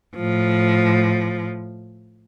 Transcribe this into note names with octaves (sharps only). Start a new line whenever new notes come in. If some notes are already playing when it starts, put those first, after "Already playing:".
A2 F3